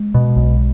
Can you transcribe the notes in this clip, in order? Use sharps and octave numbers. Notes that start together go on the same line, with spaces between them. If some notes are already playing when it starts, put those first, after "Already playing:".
Already playing: G#3
B2
B1